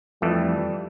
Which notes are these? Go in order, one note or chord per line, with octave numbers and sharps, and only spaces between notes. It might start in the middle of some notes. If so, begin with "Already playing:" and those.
F2 E3 G3 A3